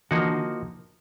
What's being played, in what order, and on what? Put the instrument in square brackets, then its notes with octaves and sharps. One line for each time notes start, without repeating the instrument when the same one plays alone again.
[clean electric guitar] D3 E3 [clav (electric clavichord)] F3 A#3 D#4 F#4